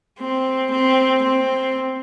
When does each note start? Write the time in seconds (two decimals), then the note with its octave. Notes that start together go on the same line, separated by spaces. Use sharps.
0.19 C4
0.70 C4
1.22 C4